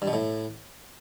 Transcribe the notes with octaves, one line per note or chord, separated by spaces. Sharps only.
G2
B2
A2